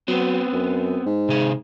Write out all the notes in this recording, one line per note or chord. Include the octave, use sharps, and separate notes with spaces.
F#3 B3 C4
F#2
G#2
C3 G#4